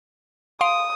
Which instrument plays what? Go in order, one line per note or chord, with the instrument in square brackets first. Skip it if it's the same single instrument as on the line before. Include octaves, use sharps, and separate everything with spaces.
[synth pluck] F5 C6 D7 [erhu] D#6